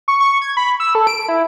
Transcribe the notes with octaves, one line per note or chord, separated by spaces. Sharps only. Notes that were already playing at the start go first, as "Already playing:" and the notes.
C#6
C#6
G#6
B5
E6
A4
D7
E4